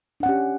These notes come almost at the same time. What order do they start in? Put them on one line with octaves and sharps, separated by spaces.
D4 F#5 C#4 G4